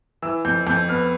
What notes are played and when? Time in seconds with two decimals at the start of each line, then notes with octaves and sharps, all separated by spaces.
0.22 E3 E6
0.45 F2 G6
0.67 F2 G6
0.89 B3 F6